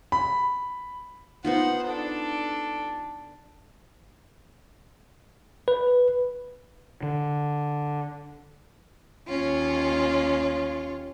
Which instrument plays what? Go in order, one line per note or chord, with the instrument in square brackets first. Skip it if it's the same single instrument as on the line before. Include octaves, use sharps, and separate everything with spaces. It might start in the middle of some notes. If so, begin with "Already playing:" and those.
[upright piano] B5
[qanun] B3 D#4 F4 [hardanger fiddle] C5 F#5
[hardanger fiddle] D4 A4
[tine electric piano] B4
[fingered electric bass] D3
[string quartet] D#2 C#4 F4